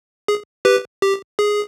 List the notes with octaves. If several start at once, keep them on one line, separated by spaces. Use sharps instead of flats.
G#4
G4 B4
G4
G#4